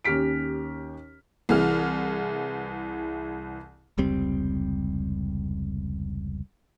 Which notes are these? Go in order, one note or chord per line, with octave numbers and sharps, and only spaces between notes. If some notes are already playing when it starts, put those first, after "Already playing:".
D#2 C#4 G4 F6 B6 D7
C2 E3 G#4 F6
F1 C#2 G3 C4